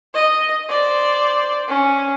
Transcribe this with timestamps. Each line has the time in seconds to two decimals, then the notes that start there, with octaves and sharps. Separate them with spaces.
0.14 D#5
0.69 C5 D5
1.68 C#4